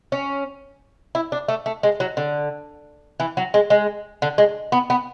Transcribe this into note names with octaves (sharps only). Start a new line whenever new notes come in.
C#4
E4
D4
A3
A3
G#3
F#3
D3
E3
F#3
G#3
G#3
D3
G#3
B3
B3